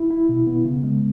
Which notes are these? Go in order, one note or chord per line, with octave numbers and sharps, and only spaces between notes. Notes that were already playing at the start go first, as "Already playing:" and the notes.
Already playing: E4
E4
B2
B3
C#3
G#3